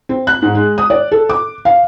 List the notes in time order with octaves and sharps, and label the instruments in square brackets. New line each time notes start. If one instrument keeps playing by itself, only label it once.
[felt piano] C4
F#6
G#2
G#3
D#6
D5
A4
D6
F5